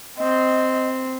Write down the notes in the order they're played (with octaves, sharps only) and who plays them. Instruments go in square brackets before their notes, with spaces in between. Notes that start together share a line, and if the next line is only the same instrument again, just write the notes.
[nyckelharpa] C4 [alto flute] D#5